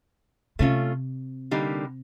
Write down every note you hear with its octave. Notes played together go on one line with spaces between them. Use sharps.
C3 A3 C#4 F4
D3 G3 A#3 D#4 G4